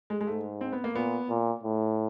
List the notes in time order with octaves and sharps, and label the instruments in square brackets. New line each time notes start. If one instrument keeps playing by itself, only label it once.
[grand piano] G#3
G#3
[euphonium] G#2 [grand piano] A3
[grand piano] C4
B3
A#3
[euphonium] A#2 [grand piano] B3
[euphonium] A#2
A2